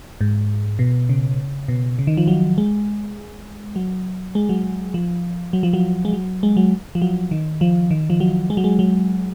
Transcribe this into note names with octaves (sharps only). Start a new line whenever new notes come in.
G#2
B2
C#3
B2
C#3
D#3
F3
F#3
G#3
F#3
G#3
F#3
F3
F#3
F3
F#3
G#3
F#3
G#3
F#3
F3
F#3
D#3
F3
D#3
F3
F#3
G#3
F#3
G#3
F#3